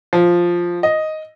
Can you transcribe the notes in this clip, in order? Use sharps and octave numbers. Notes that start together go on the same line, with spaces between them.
F3
D#5